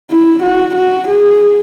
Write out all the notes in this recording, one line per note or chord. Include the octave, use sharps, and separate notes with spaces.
E4
F#4
F#4
G#4